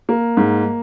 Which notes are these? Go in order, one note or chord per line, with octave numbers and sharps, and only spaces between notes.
A#3
G#2